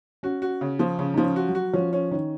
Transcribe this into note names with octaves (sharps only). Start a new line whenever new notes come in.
C#4 F#4
F#4
C#3
F3
C#3 C#4
F3 D#4
C#4
F#4
F#3
F#4
F3 C#4
C#4
D#3 C#4